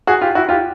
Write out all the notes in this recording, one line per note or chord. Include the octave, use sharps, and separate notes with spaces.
F#4 G#4
F4 G4
E4 F#4
F4 G4